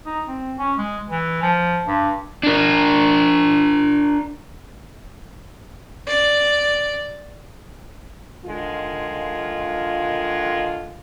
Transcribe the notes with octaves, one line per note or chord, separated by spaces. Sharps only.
D#4
C4
C#4
G#3
E3
F3
G2
D4 A#4
D5
D3 D#3 G#3 F4